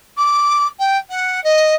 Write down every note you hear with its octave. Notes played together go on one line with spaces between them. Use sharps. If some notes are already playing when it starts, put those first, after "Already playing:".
D6
G5
F#5
D#5